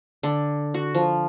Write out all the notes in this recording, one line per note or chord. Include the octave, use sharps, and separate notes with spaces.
D3
F#4
F3